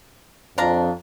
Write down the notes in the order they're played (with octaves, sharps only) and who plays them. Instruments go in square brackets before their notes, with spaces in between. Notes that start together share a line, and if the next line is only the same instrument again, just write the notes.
[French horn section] F2 [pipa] D4 F5 A#5